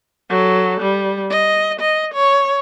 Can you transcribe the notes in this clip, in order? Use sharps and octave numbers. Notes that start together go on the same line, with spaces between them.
F#3 A4
G3
D#5
D#5
C#5